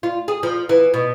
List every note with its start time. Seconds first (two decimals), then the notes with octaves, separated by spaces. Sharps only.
0.03 F4
0.28 G#4
0.43 F3
0.69 E3
0.94 B2